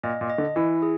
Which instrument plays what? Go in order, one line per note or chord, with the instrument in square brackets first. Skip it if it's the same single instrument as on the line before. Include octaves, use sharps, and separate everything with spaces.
[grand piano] A#2 [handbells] D#5
[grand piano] A#2
[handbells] D#5
[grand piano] D3
[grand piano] E3 [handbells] E4
[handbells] G#4